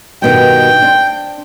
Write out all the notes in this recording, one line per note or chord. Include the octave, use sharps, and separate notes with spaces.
G2 B2 D#3 G5
C4 D4